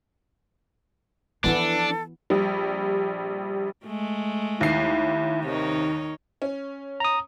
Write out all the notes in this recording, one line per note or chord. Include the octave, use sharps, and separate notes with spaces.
E3 F3 B3 D4 E4 A4
A#1 G3
G#3 A3
D#2 E4 C7
C3 D#3 D#4 C#5
C#4
A#5 D#6